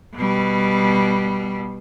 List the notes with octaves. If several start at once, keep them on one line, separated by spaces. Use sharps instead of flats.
B2 G3